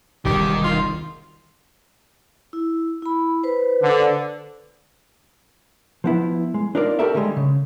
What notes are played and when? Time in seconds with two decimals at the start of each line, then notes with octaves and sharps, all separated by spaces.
0.25 E1 C2 A#2 D#3 G4
0.64 F4
2.53 E4
3.02 E4 B5
3.44 B4 C5
3.82 D3
6.04 F3 B3 E4
6.54 G#3
6.75 D4 D#4 F4 A#4 C5 D5
6.99 F#4 G4 A4 A#4 D5 E5
7.14 D3 G3 G#3
7.37 C#3